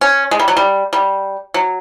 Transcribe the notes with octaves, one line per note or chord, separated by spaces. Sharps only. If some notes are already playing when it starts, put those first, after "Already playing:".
C#4
G#3
G3
F#3
G3
G3
F#3